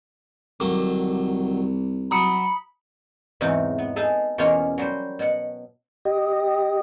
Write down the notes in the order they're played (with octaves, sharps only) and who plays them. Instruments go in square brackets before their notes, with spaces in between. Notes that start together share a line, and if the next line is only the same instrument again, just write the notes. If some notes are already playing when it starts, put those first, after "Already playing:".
[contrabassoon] C2 [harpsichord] D3 D#3 F#3 [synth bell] D6
[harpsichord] F#3 [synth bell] A#5 D#6 C#7 [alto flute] B5
[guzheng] E2 G#2 C3 E3 F#3 D#4
B3
D#4 G#4 A4 B4
E2 B2 A#3 C#4 F4 C#5
F#3 G3 C5
B2 F#5
[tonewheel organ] G4 D#5